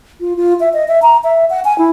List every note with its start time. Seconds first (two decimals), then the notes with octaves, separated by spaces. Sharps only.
0.20 F4
0.37 F4
0.60 E5
0.73 D#5
0.88 E5
1.02 A#5
1.24 E5
1.50 F#5
1.65 G#5
1.78 E4